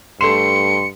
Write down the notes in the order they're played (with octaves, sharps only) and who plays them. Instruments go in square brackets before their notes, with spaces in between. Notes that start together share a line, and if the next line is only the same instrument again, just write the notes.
[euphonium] G2 [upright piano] A3 E7 [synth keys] C6 [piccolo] C#7